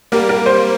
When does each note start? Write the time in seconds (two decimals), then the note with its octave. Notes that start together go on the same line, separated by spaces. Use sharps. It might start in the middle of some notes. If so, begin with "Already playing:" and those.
0.12 G3 A#3 A#4
0.29 A#4
0.46 C5